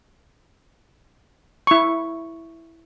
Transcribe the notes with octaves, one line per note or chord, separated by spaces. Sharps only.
E4 C#6